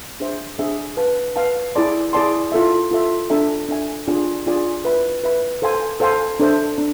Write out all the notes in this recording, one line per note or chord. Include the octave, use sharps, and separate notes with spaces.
D4 G#4 C5 E5
D4 G#4 C5 E5
B4 F5 A5
B4 F5 A5
E4 G#4 D5 A5 C6
E4 G#4 D5 A5 C6
F4 A4 E5
F4 A4 E5
D4 A4 E5 G#5
D4 A4 E5 G#5
D4 F4 G#4 D5 G#5
D4 F4 G#4 D5 G#5
B4 E5 B5
B4 E5 B5
A4 C5 F5 G#5 C6
A4 C5 F5 G#5 C6
D4 A4 C5 E5
D4